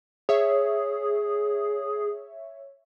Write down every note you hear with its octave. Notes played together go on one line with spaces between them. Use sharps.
G#4 C#5 E5